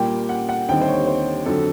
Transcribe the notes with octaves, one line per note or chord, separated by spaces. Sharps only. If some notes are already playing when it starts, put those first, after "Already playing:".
Already playing: A#2 G3 A#3 G5
F#5
F#5
D#2 D3 G3 C4 D#4 G5
C5
C#5
C5
F2 D3 F#3 A4